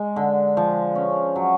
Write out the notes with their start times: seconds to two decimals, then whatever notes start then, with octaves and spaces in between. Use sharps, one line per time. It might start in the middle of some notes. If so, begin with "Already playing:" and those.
Already playing: G#3
0.16 D3
0.57 F3
0.95 C#4
1.36 F#3